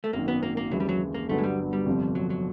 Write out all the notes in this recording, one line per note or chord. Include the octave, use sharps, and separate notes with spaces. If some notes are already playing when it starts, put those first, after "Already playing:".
A3
G#1 F#2 D#3 A#3
B3
A#3
A#3
D#2 C#3 E3 F#3 G#3
G3
F#3
A#3
G1 G2 D3 F#3 A3 B3
G#3
G3
G3
G1 F2 C3 F3
F#3
F#3